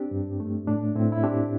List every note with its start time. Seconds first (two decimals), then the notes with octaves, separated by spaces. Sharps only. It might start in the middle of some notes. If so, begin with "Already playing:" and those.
Already playing: C4 D4 G4
0.11 G2
0.40 A3
0.68 A2 D4
0.95 A2 C4 E4
1.12 E4
1.23 C4 D4 G4